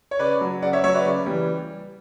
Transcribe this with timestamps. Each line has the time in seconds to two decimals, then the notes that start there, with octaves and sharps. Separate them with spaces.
0.11 C#5
0.19 C#3 B4 D5
0.41 F#3
0.62 C#3 D5 F#5
0.73 C#5 E5
0.83 F#3 C#5 E5
0.94 B4 D5
1.05 C#3
1.26 E3 G3